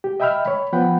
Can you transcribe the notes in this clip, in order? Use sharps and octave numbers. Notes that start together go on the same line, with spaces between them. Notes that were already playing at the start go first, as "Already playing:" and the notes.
G4
D#5 E5 G5 B5 E6 F6
C#5 B5
F3 B3 F#5 G5 B5